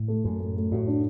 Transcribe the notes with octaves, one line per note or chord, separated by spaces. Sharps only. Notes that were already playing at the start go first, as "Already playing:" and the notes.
Already playing: A2
A3
F#2 A3
A3
A3
A2 F#4
D4